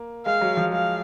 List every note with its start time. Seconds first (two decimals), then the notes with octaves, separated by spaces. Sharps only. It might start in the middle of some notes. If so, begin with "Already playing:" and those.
Already playing: A#3
0.26 G#3 F5
0.41 F#3
0.57 F3
0.72 G#3 F5